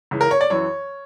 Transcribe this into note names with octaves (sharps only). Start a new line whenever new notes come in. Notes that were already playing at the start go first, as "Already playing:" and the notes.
C#2 C#3 E3
A#4
C#5
D5
F#2 E3 C#5